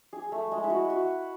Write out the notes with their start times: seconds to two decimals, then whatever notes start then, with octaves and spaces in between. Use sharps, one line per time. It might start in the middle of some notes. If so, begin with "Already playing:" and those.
0.13 G#4
0.32 A3
0.52 G#3
0.64 E4
0.70 F#4
0.90 F#4